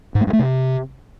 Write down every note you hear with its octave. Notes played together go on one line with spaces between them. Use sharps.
G#2
A3
G2
A3
C3